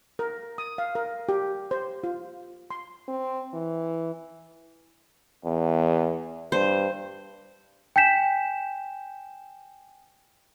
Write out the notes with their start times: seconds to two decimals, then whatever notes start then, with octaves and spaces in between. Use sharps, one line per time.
0.19 A#4
0.58 D#6
0.78 F5
0.95 A#4
1.29 G4
1.71 C5
2.04 F4
2.71 C6
3.08 C4
3.54 E3
5.45 E2
6.52 G2 C5
7.96 G5 G#5 G6 B6 E7